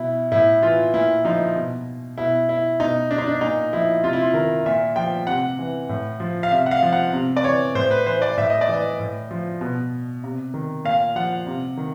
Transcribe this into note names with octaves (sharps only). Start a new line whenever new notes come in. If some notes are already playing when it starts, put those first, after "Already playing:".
Already playing: B2 E4
A2 E4
E3 F4
A#2 E4
F3 D#4
B2
B2 E4
E4
B2 D#4
D4
D#4
D4
A#2 D#4
F3 E4
C3 F4
E4
F4
D#3 A#4
A#2 E5
F3 G5
C3 F#5
E3
A2
F3
F5
C3 E5
F#5
F5
F3
F#5
C3
D5
E3 C#5
A2 C5
B4
E3 C5
D5
A2 E5
D#5
D5
E3 D#5
A2
F3
B2
C3
D#3
A#2 F5
F3 F#5
C3
D#3